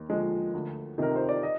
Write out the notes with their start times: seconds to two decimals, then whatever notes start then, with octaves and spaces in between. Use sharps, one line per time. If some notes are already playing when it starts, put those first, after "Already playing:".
Already playing: D#2
0.09 D3 F3 G#3
0.54 D2
0.98 C3 D#3 A#4
1.16 C5
1.29 D5
1.43 D#5